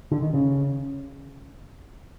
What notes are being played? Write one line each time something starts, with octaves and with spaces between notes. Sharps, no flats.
D3
D#3
C#3